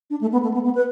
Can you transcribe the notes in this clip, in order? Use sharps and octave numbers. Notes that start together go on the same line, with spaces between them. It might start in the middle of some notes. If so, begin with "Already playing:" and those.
D4
A3
B3
A3
B3
B3
B4